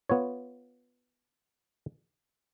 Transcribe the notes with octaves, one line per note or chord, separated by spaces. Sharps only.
B3 F4 C#5